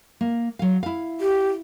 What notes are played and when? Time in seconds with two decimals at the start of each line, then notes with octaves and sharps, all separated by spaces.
0.21 A#3
0.59 F#3 F5
0.83 E4 F5
1.21 G4